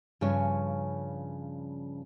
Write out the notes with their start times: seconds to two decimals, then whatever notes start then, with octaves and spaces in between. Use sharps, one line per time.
0.21 G2 C#3 F3 C#4 C#5 G#5